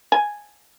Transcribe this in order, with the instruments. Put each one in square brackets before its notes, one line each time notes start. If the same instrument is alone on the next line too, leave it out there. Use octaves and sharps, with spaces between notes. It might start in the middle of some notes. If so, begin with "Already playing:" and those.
[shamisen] G#5